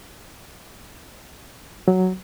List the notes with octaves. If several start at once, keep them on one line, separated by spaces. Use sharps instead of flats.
F#3